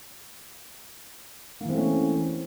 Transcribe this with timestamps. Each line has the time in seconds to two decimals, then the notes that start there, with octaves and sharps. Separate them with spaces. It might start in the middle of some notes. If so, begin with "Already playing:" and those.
1.61 A#3
1.65 E3
1.69 C4
1.73 A3
1.78 C#4